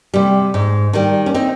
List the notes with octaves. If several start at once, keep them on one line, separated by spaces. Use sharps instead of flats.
C3 G3
G#2
D#3 G3
C#4
C4 D#4